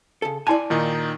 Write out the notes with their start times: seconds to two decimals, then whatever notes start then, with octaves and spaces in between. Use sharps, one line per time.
0.22 C#3 A4
0.47 E4 D5 G#5 A5
0.70 A#2 D#3 D#4 E4